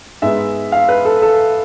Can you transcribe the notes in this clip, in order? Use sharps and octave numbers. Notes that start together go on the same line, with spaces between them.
G#2 G#3 B3 E5
F5
B4
A4
A4